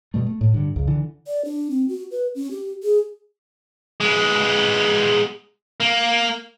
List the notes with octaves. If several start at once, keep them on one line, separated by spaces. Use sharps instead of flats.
F#2 B2 G3 A3
A3
A2
G2 D3
C#2 F#2
D3 E3
D5
D4
C4
F#4
B4
C#4
G4
G#4
G#3 B3
A#3